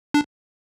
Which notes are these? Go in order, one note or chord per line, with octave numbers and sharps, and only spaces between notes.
D4